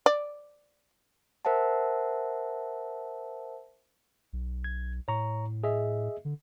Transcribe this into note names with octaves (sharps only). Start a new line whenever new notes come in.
D5
A#4 C5 E5 F#5 A5
B1
G#6
A2 C#5 A#5 C#6
G#4 D#5 E5
D3